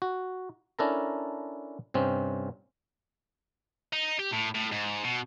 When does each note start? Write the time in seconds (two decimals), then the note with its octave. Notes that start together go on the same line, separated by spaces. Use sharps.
0.02 F#4
0.79 C#4 D4 E4 A4 A#4 A#5
1.94 G2 C3 C4 C#4
3.93 D#4
4.19 G4
4.32 A2
4.55 A2
4.72 G#2
5.04 B2